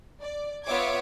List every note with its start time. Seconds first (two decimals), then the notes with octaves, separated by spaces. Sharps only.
0.21 D5
0.66 B3 F4 C#5 E5 D6 G#6